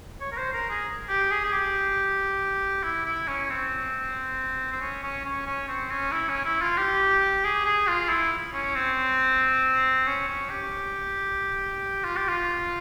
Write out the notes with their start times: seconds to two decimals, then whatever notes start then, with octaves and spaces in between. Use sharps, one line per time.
0.21 C#5
0.32 A#4
0.37 C5
0.53 A#4
0.70 G#4
1.09 G4
1.31 G#4
1.44 G#4
1.52 G4
2.83 E4
3.05 E4
3.28 C#4
3.50 C4
4.72 C4
4.81 C#4
5.03 C#4
5.25 C#4
5.46 C#4
5.68 C4
5.90 C#4
6.12 E4
6.29 C#4
6.45 E4
6.61 F4
6.77 G4
7.44 G#4
7.65 G#4
7.87 F4
8.09 E4
8.53 C#4
8.75 C4
10.07 C#4
10.28 C#4
10.50 G4
12.04 F4
12.16 G4
12.28 F4